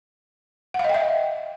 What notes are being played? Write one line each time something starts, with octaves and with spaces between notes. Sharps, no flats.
F#5
F5
D#5
G5
E5